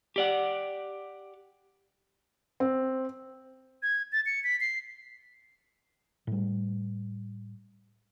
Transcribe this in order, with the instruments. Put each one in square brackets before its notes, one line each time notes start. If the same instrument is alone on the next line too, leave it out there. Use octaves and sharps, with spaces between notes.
[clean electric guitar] G4 D5 F#5
[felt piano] C4
[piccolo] G#6
A6
C#7
B6
C7
[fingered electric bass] A2 G3